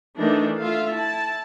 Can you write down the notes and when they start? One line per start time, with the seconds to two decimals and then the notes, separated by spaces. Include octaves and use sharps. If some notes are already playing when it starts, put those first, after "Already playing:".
0.17 D#3 E3 A3 D4 D#4
0.60 A3 F4 E5 F5
0.93 E4 A5